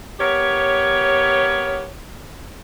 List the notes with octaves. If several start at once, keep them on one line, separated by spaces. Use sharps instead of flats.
B3 G4 A#4 C#5